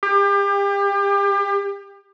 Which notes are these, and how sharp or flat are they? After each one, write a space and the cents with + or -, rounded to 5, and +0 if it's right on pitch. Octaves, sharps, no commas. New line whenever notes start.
G4 +30